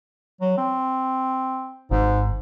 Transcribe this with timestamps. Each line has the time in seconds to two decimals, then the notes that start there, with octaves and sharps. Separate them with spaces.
0.41 F#3
0.58 C4
1.91 G#1 G#2